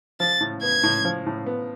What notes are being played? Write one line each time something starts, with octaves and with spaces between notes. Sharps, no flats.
F3 A6
A2
B3 G#6
A2
F3
A2
B3